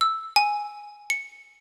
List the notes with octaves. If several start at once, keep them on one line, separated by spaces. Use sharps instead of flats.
E6
G#5
C#7